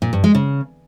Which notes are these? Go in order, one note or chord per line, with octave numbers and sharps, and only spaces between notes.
A#2
G2
G#3
C#3